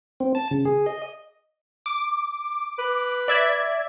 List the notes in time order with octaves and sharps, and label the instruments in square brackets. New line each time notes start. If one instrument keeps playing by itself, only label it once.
[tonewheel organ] C4
A5
C#3
G#4
D#5
[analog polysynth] D6
[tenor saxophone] B4
[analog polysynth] D5 E5 G#6